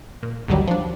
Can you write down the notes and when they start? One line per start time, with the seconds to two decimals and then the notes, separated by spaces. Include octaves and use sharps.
0.23 A#2
0.48 A1 D#2 D3 D#3 F#3 G3
0.67 F3 D4